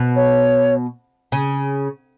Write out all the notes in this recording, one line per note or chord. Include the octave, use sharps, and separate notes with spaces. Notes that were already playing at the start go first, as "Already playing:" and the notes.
Already playing: B2
C#5
C#3